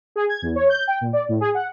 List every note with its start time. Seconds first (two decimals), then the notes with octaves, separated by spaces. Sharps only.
0.16 G#4
0.29 G#6
0.42 E2
0.56 C#5
0.69 G6
0.87 G5
1.01 A#2
1.13 D5
1.29 A2
1.41 G#4
1.54 F#5